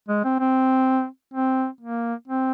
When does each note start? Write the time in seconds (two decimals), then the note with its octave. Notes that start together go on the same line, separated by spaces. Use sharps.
0.08 G#3
0.24 C4
0.40 C4
1.34 C4
1.81 A#3
2.28 C4